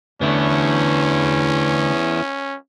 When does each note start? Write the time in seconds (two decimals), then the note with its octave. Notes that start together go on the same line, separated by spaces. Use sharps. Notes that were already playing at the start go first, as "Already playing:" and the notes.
0.22 D2 D3 A3 B3 C#4 E4